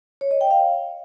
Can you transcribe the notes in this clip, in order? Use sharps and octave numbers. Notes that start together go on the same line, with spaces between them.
C#5
D#5
G5
F5